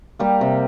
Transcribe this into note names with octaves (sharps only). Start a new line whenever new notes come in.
G3 A#3 G4
C3